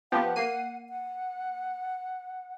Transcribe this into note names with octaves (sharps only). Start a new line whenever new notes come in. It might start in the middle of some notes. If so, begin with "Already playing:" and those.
F3 B3 G4 F#5
A#3 C7 D#7
F#5